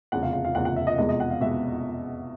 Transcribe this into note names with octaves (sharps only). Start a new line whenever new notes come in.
F1 E2 C#3 F#5
F5
F5
F5
F1 E2 C#3 F#5
F#5
E5
D#5
F1 E2 B2 G#3 D#5
D#5
F#5
F5
B2 G#3 E5